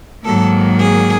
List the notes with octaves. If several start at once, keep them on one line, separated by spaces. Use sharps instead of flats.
G#2 D#3 F#3 A#3 A4
G#4